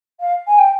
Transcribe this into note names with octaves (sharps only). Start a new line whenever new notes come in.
F5
G#5
G5